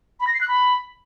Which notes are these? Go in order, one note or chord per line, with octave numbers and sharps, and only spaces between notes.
B5
A#6
C7
F#6
B5